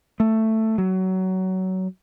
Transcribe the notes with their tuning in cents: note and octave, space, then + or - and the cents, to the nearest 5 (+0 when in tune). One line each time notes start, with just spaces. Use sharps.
A3 +10
F#3 +20